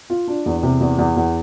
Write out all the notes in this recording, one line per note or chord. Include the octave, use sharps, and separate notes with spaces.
F4
D4
E2
C3
E2
E2
E2